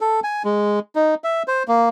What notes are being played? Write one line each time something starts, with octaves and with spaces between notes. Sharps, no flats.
A4
G#5
G#3
D#4
E5
C5
A#3